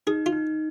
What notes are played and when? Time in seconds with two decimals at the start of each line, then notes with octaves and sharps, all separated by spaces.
0.07 D#4 G#4
0.26 F4
0.32 D#4